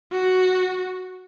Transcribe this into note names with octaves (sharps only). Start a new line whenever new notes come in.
F#4